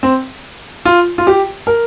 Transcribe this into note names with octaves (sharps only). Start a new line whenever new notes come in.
C4
F4
F4
G4
A#4